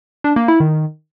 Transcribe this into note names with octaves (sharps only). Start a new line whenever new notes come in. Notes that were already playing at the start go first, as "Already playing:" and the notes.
D4
A#3
E4
D#3